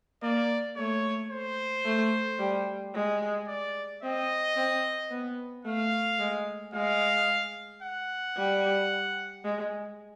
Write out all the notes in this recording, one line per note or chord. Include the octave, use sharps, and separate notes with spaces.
A#3 D5
A3 C#5
C5
A3
G3
G#3
D5
C4 D#5
C4
B3
A3 F5
G#3
G#3 F5
F#5
G3
G#3